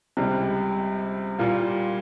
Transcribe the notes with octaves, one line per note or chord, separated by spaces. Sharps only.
C#2 C3 G3
A#2 G3 A#3 F4